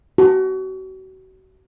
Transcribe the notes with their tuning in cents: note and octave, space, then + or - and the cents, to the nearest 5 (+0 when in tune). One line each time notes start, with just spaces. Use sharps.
F#4 +35